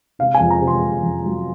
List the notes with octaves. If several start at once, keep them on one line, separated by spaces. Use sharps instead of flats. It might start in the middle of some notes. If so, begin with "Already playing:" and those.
C3 F5
G#5
F2
A#5
C3
C6
C3
F2
F#3